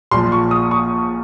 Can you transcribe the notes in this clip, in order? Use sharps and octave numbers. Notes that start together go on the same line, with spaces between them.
A#1 A#2 F3 C6
C#6
D#6
C#6